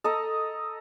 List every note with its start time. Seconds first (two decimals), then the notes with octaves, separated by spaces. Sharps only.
0.04 A4 D#5 A#5